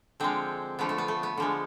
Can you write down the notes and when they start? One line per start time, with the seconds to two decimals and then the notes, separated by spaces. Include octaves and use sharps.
0.20 D3 F3 G#3 C4
0.79 D3 F3 A3 B3
0.89 A3
0.98 B3
1.08 A3
1.23 B3
1.37 D3 F3 G#3